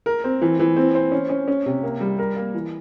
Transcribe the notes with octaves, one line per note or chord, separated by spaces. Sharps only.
A#4
C4
E3
E3
C4
C5
C#4
C#4
C#4
C3
A#3
G3
A#4
A#3
E3